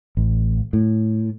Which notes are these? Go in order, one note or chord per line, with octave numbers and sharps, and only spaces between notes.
A1
A2